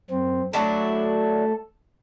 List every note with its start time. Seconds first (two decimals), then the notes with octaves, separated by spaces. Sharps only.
0.10 F#2 C4
0.53 F#3 A3 D4 E4 A4